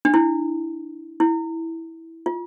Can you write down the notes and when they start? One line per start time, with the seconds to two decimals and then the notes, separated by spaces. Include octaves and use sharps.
0.05 D4
0.14 E4
1.20 E4
2.26 F4